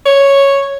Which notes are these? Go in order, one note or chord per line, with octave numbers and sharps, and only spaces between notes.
C#5